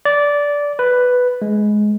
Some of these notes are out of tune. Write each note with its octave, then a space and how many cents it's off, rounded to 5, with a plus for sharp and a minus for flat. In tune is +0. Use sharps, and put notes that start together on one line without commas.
D5 -15
B4 +5
G#3 +15